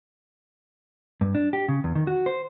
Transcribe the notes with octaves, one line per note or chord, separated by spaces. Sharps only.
G2
D4
G4
C#3
E2
D#3
F#4
C5